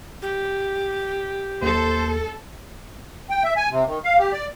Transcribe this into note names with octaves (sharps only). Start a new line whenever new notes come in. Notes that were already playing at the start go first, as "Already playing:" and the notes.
G4
D#2 A4 C5
G5
E5
G#5
C3
D#3
F5
G4
D5